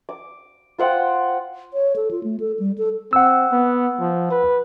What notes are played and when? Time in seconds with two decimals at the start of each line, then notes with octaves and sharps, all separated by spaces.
0.09 D6
0.78 F4 C5 F#5 G5
1.74 C#5
1.96 A4
2.11 F4
2.23 A3
2.40 A4
2.59 G3
2.78 A4
3.13 C4 F#5 E6
3.52 B3
4.00 F3
4.31 B4